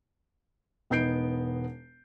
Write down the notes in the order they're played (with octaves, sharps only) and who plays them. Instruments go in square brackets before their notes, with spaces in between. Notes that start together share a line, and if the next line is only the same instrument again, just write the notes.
[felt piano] E1 B3 D#4 G6 C7 D7